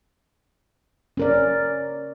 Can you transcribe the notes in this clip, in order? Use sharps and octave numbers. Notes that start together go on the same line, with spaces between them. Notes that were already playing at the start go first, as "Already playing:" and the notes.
C#4 A#4 D5